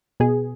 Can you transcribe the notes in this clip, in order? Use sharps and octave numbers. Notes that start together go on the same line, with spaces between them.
B2 G#4